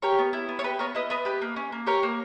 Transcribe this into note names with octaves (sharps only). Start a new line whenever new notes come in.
G4 A#4 C#5
B3
E4
B3
C#5
G4 B4
B3 A#4 C#5
E4 B4 D#5
B3 B4 D#5
G4 B4
A#3
C#4
A#3
G4 A#4 C#5
A#3